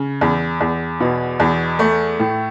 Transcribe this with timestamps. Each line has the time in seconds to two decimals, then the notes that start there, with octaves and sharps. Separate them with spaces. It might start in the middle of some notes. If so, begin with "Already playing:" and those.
Already playing: C#3
0.21 E2
0.61 E2
1.00 B2
1.40 E2
1.79 A3
2.19 A2